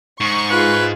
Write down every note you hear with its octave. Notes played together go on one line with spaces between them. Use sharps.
G#2 C#6
F4 G#4 B4